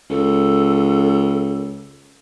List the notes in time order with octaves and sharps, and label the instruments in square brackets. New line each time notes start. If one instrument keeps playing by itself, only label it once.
[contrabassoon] C#2 [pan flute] A4